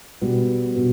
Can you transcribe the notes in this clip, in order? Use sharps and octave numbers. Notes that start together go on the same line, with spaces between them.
B2 G3 B3 F#4
B2 G3 B3 F#4